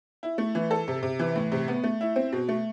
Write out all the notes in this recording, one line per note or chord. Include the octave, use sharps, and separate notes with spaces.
E4
A3
E3
A4
C3
C3
E3
A2
C3
B3
A3
E4
C4
B2
A3